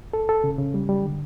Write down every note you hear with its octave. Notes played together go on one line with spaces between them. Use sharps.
A4
A4
C#3
C#3
G3
G3
D3